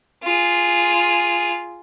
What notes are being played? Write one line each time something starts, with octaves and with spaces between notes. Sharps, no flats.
F4 G#4